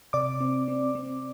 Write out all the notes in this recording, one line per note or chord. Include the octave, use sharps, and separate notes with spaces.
C3 D5 D6
C4
C4
C4